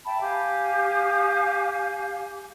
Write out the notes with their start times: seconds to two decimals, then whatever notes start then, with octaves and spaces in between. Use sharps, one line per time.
0.05 E5 G5 A5 B5
0.21 G4 F5 G#5 D6